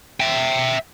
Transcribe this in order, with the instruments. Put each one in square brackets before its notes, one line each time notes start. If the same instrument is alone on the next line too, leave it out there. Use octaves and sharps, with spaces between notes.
[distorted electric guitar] E5 G5